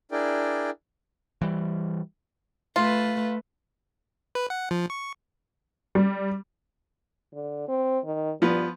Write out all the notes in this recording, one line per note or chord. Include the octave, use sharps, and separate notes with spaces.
D4 E4 G#4 A#4 D5 G5
E3 G3
A3 F4 B4
B4
F#5
F3
C#6
G3
D3
C4
D#3
G2 F3 B3